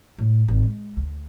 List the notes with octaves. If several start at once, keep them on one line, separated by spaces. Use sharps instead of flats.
A2
G#1
G#3
D2